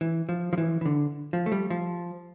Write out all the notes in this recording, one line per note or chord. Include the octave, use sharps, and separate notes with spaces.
E3
F3
F3
E3
E3
D3
F3
A3
G3
F3